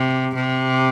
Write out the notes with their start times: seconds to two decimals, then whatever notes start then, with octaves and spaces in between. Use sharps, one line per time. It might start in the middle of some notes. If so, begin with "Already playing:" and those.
Already playing: C3
0.35 C3